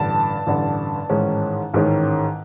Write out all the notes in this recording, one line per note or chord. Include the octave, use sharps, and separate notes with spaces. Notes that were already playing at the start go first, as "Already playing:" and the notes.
Already playing: A1 G2 D3 A5
A1 G2 D3
A1 G#2 D#3 G#3 C#4
A1 G#2 D#3 G#3 C#4